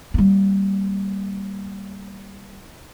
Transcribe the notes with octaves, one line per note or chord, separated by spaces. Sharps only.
G3 A#3